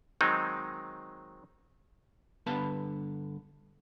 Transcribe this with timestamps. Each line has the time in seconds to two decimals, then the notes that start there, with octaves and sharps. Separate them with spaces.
0.21 D#3 F#3 G#3 C4 D#4
2.46 G2 D3 B3 B4 F5 A5